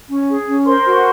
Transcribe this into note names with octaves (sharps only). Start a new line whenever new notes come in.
C#4
G#4
C#4
A#4 C5 C6
F#4